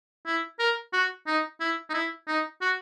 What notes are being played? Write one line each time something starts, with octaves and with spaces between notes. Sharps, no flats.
E4
A#4
F#4
D#4
E4
D#4
E4
D#4
F#4